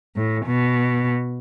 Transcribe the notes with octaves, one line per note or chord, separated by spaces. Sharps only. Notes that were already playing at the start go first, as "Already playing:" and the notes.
A2
B2